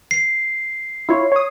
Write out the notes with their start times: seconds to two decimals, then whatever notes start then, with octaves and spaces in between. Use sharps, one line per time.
0.11 C7
1.09 E4 F4 C#5
1.32 C#5 D#6